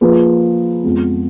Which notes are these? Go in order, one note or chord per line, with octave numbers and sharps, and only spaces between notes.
F3 A#3 F4 G#4 B4
F2 F3 G#3 B3